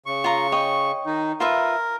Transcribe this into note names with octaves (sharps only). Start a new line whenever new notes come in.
C#3 C#6
F4 A#5
C#5 D#5 G5
D#3 D#4
F4 A#4 B4 E5